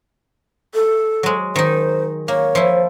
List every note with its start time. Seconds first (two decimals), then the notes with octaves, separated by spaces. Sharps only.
0.74 A4
1.23 F#3 G#3
1.56 D#3 D#4 C5
2.28 A#3 C#5
2.55 F3 E4